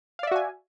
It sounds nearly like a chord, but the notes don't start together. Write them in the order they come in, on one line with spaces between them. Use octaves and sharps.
F5 D5 E5 F#4 G#5